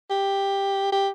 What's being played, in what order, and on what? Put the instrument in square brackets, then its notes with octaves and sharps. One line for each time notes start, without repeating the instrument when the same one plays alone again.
[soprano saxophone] G4
G4